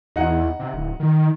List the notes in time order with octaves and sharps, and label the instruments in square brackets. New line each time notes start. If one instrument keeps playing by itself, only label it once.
[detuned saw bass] E2 [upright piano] D#4 F#5
[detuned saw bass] C3
D1
D#3